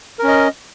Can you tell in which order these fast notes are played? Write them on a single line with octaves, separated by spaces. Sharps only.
A#4 C#4 D#5